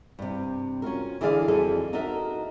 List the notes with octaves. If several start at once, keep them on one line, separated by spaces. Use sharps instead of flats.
G2 C3
C#4 F4 F#4 A#4
D3 E3 E4 G#4 D5 F5
F2 E3 G3 F#4 G#4 A4
D#4 F#4 A4 A#4 D#5 E5